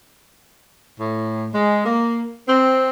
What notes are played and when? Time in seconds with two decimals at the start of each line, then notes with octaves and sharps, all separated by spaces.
0.99 A2
1.52 G#3
1.85 A#3
2.47 C4